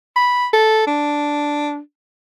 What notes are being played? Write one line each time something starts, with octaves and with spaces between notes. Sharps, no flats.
B5
A4
D4